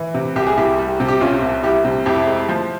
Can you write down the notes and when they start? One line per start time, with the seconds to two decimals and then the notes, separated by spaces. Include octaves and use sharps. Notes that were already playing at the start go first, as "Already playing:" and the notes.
Already playing: E3
0.14 C3
0.36 C2 G4
0.47 G#4
0.57 C2 E4 G4
0.78 G3
1.00 C3
1.08 G4
1.21 C2 C#4 F4
1.42 C2
1.63 G3 E4 G4
1.85 C3
2.06 F2 E4 G4
2.27 G#3
2.49 F3